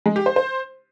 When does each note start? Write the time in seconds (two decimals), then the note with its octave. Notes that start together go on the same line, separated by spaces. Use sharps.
0.06 G#3
0.16 G4
0.26 C5
0.36 C5